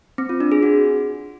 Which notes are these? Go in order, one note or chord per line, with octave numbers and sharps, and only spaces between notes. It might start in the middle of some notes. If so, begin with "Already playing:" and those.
C4
F4
D4
G#4
F#4